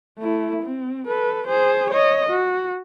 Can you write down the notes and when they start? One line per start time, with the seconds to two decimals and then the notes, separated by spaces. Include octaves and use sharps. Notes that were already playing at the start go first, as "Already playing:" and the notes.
0.19 A3 E4
0.63 C4
1.07 A4 B4
1.48 G#4 C5
1.91 C#5 D#5
2.30 F#4